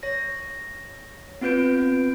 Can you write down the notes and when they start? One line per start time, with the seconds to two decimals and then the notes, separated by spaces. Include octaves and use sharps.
0.03 C#5 A#6
1.41 B3 C4 F4 B4 G6 D7